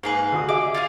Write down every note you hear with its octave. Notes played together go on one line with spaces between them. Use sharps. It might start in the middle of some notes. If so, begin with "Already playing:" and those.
G#2 A#3 G#4 B4
D2 F#4 D#6
G#4 D#5 E5 D6
F4 G#4 F5